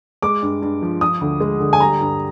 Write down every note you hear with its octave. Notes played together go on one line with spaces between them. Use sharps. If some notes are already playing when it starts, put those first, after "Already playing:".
G#3 D6
G2
G2
F3
F3 D#6
D2
G#3
D3
G#5
G3 A#5
G2